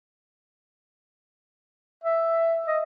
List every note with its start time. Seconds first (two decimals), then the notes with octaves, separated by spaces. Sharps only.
2.04 E5
2.67 D#5